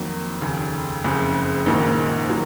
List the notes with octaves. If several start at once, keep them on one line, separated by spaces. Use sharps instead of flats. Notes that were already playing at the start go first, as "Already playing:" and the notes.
Already playing: F2 D#3 F#3 A#3
F1 D#2 C#3
F#1 F2 C#3
A#1 G#2 D#3 A#3
D#3 F#3 A#3